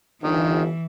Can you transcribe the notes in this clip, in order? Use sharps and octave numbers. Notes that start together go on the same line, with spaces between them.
G1 D#3 E3